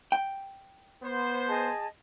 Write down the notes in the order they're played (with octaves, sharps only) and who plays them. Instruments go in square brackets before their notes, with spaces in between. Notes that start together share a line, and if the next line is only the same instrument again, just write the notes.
[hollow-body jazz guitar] G5
[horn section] B3 C5
[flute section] G#4 D#5 A5